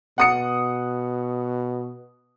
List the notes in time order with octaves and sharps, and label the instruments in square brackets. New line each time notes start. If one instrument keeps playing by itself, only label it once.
[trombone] B2 [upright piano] F#5 D#6 C#7